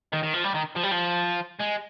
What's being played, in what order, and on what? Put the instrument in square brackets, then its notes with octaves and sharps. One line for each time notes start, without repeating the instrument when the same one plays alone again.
[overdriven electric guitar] D#3
D#3
F3
G3
D#3
F3
G3
F3
G#3